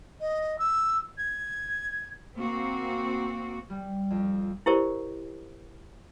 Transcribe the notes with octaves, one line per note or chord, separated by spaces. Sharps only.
D#5
E6
G#6
A#3 C4 F#4
G3
F2
E4 G4 A#4 C5 D5